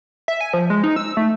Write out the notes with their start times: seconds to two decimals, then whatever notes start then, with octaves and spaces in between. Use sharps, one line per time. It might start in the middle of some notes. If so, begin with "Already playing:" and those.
0.28 E5
0.41 G#5
0.53 F3
0.70 G#3
0.83 D#4
0.96 E6
1.17 A3